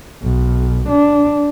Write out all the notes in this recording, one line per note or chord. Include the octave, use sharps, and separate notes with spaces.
B1
D4